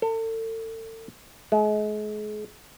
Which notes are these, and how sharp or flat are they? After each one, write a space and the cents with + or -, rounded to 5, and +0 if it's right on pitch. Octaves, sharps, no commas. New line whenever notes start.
A4 +35
G#3 +35